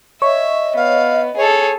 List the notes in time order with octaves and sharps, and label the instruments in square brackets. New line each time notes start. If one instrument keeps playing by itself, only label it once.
[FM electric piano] C#5 [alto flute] D#5 [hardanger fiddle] E5
[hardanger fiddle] B3 [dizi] F5
[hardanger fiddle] G#4 A4 [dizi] C#5